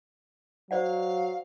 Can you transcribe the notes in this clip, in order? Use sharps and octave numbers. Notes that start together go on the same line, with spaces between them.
F#3 C5 D5 F5 F#5